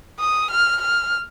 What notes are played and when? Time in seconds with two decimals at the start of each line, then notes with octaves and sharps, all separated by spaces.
0.19 D#6
0.51 F6
0.81 F6